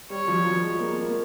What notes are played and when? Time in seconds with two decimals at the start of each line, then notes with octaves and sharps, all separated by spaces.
0.10 G3 C#5
0.28 F3
0.45 F3
0.62 G#3
0.80 A#3
0.98 A#3